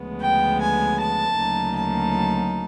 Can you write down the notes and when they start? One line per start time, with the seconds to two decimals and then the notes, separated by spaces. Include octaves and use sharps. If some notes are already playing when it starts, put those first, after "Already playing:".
Already playing: D2 C#3 F3 G#3 B3
0.21 G5
0.60 G#5
0.99 A5
1.37 D2 C#3 F#3 A#3 D#4
1.76 A5